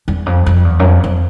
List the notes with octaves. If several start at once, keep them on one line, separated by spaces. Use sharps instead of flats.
E2
F2
F2
E2
F#2
F2
F2